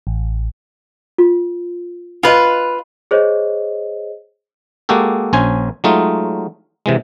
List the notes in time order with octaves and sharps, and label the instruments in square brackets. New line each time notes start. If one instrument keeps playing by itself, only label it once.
[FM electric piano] A1
[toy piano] F4
[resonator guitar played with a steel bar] F4 B4 [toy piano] D#5 G#5
[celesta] G#4 C5 C#5 D#5
[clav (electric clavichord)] G#3 A#3 F#4 G4 A4
A#1 C#4 C5 G#5
F#3 G#3 A3 D#4 F4
C3 E3 G#3